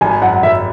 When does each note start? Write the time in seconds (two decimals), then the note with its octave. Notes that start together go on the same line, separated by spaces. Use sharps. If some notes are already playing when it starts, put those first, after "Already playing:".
0.01 G#1 G#5
0.22 F#2 F#5
0.43 G#1 E5